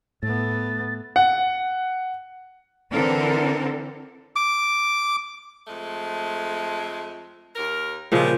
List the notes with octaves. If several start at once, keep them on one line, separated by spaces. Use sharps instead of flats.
A2 A3 B3 A6
F#5
D3 E3 C4 A4 A#4
D6
F2 G#3 A3
D#2 A#4
A#2 C#3 F3 G3 G#3